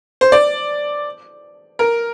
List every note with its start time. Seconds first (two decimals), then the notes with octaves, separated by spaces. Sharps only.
0.21 C5
0.32 D5
1.79 A#4